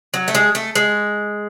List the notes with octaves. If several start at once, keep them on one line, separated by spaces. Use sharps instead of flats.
F#3
A3
G#3
A3
G#3